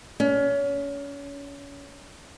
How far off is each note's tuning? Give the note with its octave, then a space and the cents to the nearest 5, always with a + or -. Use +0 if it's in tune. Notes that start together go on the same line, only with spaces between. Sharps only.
C#4 +30